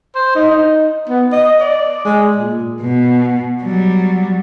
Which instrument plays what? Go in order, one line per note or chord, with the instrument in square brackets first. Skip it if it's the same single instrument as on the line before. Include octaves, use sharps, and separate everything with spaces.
[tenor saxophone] C5
D#4
D#4
B3
D#5
D5
G#3
A#2
[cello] B2
F#3 G3